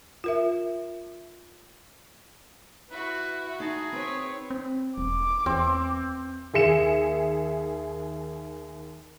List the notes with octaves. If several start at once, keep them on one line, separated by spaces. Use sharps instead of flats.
F4 A#4 E5
E4 F#4 B4
D#4 G#4 D#5 A5
C4 B4 C#5
C4
E1 D6
E2 C4
D#2 G#4 E5 C#7 E7